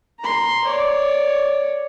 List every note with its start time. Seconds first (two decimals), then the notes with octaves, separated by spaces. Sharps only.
0.20 A#5 C6
0.64 C#5 D5